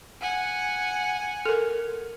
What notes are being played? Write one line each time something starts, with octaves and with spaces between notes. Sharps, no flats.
F#5 G#5
A4 A#4